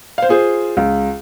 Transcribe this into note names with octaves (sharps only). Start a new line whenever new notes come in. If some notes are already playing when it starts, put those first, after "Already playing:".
C5 F5
F4 G#4 C5
C#2